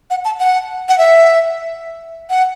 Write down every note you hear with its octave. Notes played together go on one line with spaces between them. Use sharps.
F#5
A5
F#5
F#5
E5
F#5